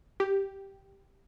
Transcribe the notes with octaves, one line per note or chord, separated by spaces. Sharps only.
G4